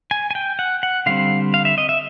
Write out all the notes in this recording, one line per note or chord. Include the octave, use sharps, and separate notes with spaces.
G#5
G#5
G5
F#5
F#5
D3 G3 C4 F5
F5
E5
D#5
E5